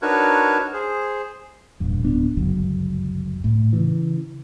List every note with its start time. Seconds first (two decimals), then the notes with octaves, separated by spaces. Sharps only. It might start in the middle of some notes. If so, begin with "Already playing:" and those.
0.02 D4 D#4 F#4 A#4 B4 C#5
0.73 G#4 C5
1.80 E1 A#1 G2
2.04 D1 B3 D4
2.37 G1 C#2 F#2 F#3
3.44 A2
3.73 C#3 E3